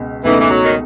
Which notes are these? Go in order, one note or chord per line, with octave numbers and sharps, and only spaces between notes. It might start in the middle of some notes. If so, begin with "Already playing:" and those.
Already playing: C#2 B2
C#2 B2 E3 A3 D#4
E3
F#3
D#3